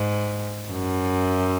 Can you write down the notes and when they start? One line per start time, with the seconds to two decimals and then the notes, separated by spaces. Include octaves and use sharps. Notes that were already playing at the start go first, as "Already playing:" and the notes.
Already playing: G#2
0.72 F#2